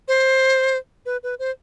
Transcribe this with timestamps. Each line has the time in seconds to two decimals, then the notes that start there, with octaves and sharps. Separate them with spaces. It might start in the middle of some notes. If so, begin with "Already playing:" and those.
0.08 C5
1.06 B4
1.23 B4
1.39 C5